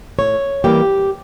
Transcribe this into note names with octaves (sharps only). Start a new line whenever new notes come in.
A2 C#5
E3 G3 A#3 G4